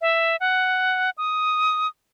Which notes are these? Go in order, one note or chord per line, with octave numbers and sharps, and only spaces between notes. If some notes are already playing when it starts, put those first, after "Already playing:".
E5
F#5
D#6